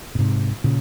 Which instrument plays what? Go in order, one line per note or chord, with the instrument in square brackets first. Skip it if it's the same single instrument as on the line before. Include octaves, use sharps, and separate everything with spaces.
[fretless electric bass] A#2
G#2 C3
A#2 C#3